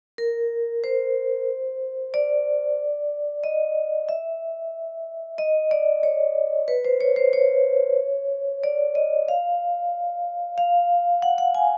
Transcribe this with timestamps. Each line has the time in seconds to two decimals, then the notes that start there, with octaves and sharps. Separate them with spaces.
0.18 A#4
0.84 C5
2.14 D5
3.44 D#5
4.09 E5
5.38 D#5
5.71 D5
6.03 C#5
6.68 B4
6.85 C5
7.01 C#5
7.16 C5
7.33 C#5
8.63 D5
8.95 D#5
9.28 F5
10.58 F5
11.22 F#5
11.38 F#5
11.55 G#5